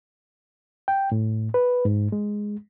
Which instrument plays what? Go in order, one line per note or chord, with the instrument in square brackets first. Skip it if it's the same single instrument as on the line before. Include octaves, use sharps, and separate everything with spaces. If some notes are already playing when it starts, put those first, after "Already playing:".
[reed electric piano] G5
A2
B4
G#2
G#3